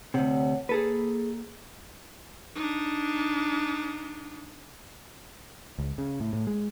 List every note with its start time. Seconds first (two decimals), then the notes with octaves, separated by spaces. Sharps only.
0.14 D2 C3 C#5 F#5
0.69 A#3 G#4 A4 B4
2.56 D4 D#4
5.79 C#2
5.98 C#3
6.20 A2
6.33 A2
6.47 G#3